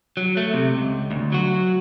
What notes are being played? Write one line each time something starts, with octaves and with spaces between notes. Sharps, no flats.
F#3
A3
C3
C#2
D2
F#3 F#4